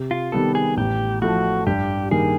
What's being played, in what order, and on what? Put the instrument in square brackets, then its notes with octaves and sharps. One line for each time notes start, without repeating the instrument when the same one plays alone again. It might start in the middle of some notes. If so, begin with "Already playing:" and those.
Already playing: [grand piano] C3
[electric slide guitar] F4
[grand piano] D#3 G3 B3 [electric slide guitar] A4
[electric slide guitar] G#4
[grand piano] A1 [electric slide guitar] G4
[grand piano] A2 F3 A3 [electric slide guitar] F#4
[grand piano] G2 [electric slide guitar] G4
[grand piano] D#3 G3 A#3 [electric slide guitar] G#4